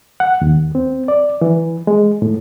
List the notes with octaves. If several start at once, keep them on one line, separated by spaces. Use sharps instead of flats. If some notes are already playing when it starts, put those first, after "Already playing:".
F#5
D#2
C4
D5
E3
G#3
A2